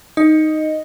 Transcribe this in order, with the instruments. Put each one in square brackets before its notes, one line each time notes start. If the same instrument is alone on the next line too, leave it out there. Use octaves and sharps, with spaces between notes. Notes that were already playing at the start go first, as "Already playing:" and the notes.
[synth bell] D#4 [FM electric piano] D#5